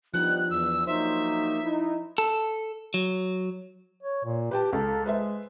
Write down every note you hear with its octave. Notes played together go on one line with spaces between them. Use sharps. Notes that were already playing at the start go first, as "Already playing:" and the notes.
F3 G3 B3 D4 D#4 F#6
E2 E6
F#3 A#3 D#4 C5 E5
D#4 E4
A4
F#3
C#5
A#2
G4 B4 G5 A5
C#2 A4
G#3 B4 C5 E5